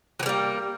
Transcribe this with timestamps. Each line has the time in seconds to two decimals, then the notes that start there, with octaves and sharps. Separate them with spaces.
0.20 F#3
0.23 E3
0.26 G3
0.29 A#3